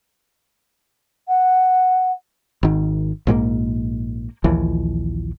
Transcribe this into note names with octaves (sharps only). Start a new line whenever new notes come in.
F#5
G#1 D#3
A#1 G#2 D#3 A#3
A#1 D#2 E3 F3